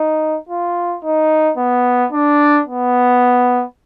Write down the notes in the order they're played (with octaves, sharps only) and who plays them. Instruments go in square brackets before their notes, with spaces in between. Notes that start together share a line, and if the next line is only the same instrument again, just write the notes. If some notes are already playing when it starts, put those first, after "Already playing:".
Already playing: [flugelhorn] D#4
F4
D#4
B3
D4
B3